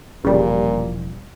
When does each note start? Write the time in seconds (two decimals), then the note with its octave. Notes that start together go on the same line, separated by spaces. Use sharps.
0.24 E1 A#2 C#3 F3 G3